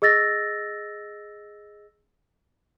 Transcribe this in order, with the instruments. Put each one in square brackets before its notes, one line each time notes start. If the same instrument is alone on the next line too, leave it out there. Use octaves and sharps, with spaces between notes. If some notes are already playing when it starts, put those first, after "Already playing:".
[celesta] G#4 D#5 E6 A6 A#6